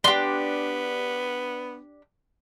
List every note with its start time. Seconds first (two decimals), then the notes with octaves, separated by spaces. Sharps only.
0.04 B3 D4 G4 C6